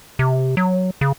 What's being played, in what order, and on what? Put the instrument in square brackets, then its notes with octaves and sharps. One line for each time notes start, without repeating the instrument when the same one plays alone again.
[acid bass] C3
F#3
C#3